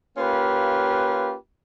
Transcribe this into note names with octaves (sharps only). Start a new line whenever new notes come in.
A#3 C#4 F4 G4 B4